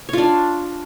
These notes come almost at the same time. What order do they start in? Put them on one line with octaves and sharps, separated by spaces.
C#5 F4 D4